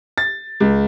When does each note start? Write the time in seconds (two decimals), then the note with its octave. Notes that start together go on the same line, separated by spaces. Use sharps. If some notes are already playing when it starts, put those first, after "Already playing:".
0.18 A6
0.60 C#2